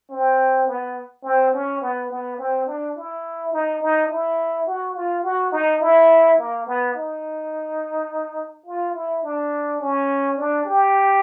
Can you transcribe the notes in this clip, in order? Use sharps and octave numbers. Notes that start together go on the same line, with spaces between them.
C4
B3
C4
C#4
B3
B3
C4
D4
E4
D#4
D#4
E4
F#4
F4
F#4
D#4
E4
A#3
B3
D#4
F4
E4
D4
C#4
D4
G4